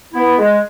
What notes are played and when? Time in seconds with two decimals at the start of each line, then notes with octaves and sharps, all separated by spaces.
0.13 B3 E4
0.37 G#3